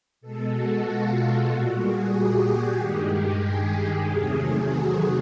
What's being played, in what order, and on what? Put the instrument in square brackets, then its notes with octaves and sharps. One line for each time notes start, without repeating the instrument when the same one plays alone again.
[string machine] B2 G#3 A4
F#4
F4
A#2 G3 F#4
G#4
G4
G2 D#3 G#3
G#4
E2 C3 D#3 F#3 A3
F#4